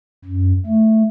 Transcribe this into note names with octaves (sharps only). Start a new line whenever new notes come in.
F#2
A3